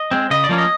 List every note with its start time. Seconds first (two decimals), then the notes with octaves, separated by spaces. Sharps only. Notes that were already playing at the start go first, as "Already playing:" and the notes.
Already playing: D#5
0.11 G#3 C4
0.30 C#3 D#5
0.44 D5
0.49 F3 A#3 C#4
0.58 D#5